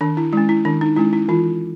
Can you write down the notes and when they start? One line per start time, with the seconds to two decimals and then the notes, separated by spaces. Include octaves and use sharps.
0.01 D#3 D4
0.17 E4
0.33 G#3 C#4 E4
0.49 E4
0.65 D#3 D4
0.81 D#4
0.96 G#3 C#4 E4
1.13 E4
1.28 E3 F4